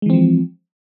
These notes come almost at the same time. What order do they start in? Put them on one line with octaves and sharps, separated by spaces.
G#3 E3 C4 F3